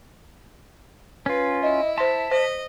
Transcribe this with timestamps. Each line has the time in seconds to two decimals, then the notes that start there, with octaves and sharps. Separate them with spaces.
1.26 C#4 F4 B4
1.63 E4 D#5
1.98 C5 A5 C6 B6
2.32 C5 D#5